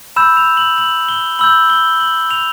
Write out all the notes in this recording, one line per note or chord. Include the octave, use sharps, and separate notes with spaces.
B5 E6 G6 E7
F7
F#7
F#7
G7
B5 E6 G6 F#7
G7
F#7
F7